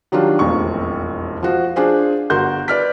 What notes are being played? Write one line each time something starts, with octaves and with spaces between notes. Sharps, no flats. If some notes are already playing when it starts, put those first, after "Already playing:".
D#3 F#3 G3 D4 F4
E1 A1 F2 C#6
F3 F4 F#4
D4 F4 G#4 C5
G1 F#4 A#4 C6 G6
B4 D5 F6 B6